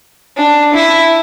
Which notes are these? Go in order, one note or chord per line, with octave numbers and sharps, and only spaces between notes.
D4
E4